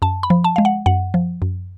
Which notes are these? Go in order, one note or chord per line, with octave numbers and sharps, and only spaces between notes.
F#2 A5
B5
F3
A5
G#3 F5
F#5
F#2 F#5
F3
F#2